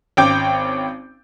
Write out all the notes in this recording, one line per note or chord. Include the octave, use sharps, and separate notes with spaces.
G#1 C#4 G5 D6 G6 D7